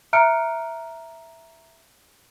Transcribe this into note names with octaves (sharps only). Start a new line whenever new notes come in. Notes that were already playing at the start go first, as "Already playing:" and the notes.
E5 A#5 F6 F#6 C#7 D7